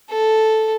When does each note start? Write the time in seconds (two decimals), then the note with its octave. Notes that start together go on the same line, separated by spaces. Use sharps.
0.10 A4